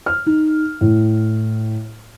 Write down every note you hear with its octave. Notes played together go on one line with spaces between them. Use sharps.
F6
D#4
A2